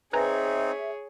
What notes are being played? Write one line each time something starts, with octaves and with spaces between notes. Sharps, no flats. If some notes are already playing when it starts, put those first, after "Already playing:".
C4 D#4 G#4 B4 C#5 E5 G#5 A#5